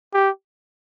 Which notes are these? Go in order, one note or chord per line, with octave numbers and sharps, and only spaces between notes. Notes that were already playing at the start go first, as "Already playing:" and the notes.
G4